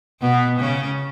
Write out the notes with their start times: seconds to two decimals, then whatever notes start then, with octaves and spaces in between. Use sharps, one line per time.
0.21 B2 B3
0.60 C#3 C#4